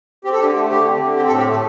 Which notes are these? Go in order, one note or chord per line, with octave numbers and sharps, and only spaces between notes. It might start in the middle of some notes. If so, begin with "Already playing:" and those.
C4 G4
A4
D3 G4
A3 A4
D3 G4
C4
D3
C4 G4
A4
A2
G4
A3 A4